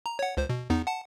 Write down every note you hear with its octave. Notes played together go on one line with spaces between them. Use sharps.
A#5
C#5 F#5
C#2 C5
B2
E2 B3 D#4
F#5 A5